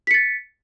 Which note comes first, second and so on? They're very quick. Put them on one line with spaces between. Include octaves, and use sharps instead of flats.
B6 C#7 A6